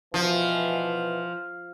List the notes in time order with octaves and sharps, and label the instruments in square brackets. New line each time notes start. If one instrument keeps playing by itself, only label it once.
[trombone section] B2 E3 [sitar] F3